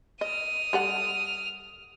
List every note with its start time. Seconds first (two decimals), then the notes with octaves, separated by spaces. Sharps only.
0.21 D#5 D#6 F6
0.73 G3 A4 F#5